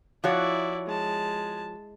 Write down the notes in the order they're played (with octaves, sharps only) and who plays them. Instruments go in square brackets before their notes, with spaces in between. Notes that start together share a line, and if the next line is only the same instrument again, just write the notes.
[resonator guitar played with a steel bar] F3 F#4 C#5 [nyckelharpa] E4 D5
[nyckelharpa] G#3 A5